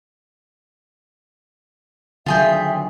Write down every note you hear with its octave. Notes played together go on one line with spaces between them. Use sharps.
D3 D#3 F#3 F4 G#4 E5 G5